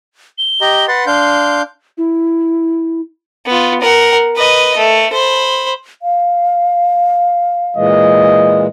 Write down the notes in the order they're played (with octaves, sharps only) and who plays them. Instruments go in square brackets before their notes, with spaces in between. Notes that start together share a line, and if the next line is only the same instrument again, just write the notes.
[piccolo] G7
[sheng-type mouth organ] G4 D#5 A#5
[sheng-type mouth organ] B4 F#5 C6 [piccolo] A6
[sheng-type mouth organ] D4 F5 G6 [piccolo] C6
[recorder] E4
[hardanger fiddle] B3 F4
A#4 F#5
B4 D#5
A3
C5 B5
[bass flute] F5
[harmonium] A#2 E3 G#3 [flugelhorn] D#5